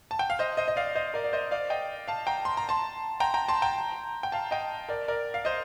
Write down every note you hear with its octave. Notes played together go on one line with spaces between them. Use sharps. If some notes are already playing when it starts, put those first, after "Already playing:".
A5
G5
F5
C5 D#5
C5 D#5
D#5
D5 F5
C5 D#5
A#4 D5
D5
C5 D#5
D5 F5
D#5 G5
F5 A5
G5 A#5
C6
A#5
A5 C6
G5 A#5
G5 A#5
A5 C6
G5 A#5
G5
F5 A5
D#5 G5
A#4 D5
A#4 D5
F5
C5 D#5